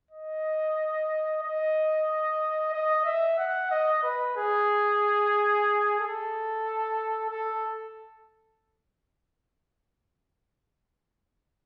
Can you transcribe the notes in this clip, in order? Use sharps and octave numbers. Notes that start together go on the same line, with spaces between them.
D#5
D#5
D#5
E5
F#5
D#5
B4
G#4
A4
A4